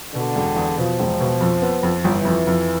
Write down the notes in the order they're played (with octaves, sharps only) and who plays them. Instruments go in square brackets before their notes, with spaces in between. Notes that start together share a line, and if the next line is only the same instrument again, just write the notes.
[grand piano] B2 [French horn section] D3
[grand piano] E1
E2
[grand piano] B2 [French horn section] F3
[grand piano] E1
B2
F2
B3
F2
[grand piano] G1 [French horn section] E3
[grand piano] F2
F2